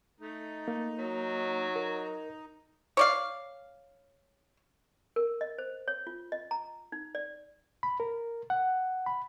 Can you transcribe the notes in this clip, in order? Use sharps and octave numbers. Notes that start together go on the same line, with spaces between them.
A3 D#4
A#3
F#3
A#4
C#5 D5 F5
A#4
D#5
C5
C#5
F4
D#5
A#5
D#4
D5
B5
A#4
F#5
B5